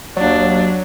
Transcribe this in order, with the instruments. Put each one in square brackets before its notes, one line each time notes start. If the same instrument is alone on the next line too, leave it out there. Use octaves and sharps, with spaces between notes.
[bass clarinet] D#2 [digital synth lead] F#3 [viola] D4